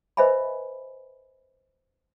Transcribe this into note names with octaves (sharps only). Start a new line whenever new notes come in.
B4 C5 D#5 E5 G#5 B5